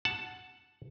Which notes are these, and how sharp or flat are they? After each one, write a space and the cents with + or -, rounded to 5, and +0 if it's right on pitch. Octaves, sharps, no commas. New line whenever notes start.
F#5 +0 A5 +0